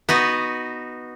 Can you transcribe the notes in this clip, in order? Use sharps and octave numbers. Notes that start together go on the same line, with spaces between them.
B3 D#4 F#4